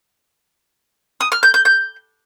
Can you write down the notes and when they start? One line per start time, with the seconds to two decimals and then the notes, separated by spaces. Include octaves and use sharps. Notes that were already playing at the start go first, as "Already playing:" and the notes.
1.21 D#6
1.32 F6
1.43 G6
1.54 G6
1.65 G6